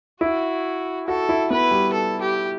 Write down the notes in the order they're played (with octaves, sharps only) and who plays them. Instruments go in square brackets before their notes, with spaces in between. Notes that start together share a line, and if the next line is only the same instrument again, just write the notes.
[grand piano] E4 [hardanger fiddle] F#4
[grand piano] F#4 [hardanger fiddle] A4
[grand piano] E4
[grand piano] B3 [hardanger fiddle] B4
[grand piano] G3
[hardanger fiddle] A4
G4